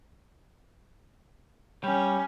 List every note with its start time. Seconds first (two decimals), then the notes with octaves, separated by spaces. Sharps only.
1.84 G3 C#4